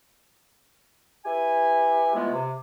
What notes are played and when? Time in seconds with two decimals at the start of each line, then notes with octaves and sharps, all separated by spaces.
1.25 E4 G4 B4 G#5
2.14 B2 E3 F3 G#3 A3 B3
2.32 C3